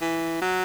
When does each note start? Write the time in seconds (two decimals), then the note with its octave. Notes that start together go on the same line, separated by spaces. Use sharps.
0.01 E3
0.41 F#3